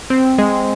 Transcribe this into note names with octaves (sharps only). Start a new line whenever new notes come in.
C4
G#3